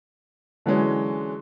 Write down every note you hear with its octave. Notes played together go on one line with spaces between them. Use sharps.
D3 E3 F#3 G#3 C#4